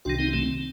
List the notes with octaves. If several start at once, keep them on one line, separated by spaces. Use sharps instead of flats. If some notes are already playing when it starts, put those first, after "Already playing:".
C2 C3 D#3 D4 F#4
C4 D#4
A3 C4